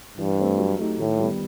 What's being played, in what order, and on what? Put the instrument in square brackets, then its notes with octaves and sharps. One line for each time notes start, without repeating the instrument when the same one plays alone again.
[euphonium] G2 [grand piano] E3
[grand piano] A3 C4
F#3
A3 D#4 G4
[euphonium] A2 [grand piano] D#3
[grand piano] G3 B3